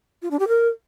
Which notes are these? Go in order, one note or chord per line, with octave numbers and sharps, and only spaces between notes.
F4
D4
G4
A#4